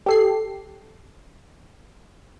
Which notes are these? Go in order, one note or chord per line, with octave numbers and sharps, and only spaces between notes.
G4 A4 C7